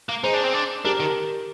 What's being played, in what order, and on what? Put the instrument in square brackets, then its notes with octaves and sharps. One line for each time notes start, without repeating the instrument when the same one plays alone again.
[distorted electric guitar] A#3
[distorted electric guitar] D#4 [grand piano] G#4 C5
[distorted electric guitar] D4
C4
D4
[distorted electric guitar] D4 [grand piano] G4 A#4
[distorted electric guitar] D#3